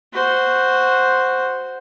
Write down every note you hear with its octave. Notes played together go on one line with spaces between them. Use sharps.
F#4 C5